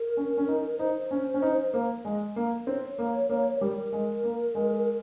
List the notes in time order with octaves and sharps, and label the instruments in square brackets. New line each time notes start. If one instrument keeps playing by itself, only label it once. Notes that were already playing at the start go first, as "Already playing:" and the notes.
Already playing: [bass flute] A#4
[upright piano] C#4
C#4
D#4
[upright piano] D#4 [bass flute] C5
[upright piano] C#4
C#4
D#4
A#3
G#3
A#3
[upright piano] C4 [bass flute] C#5
[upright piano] A#3
A#3
[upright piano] G3 [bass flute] A#4
[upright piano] G#3
A#3
G#3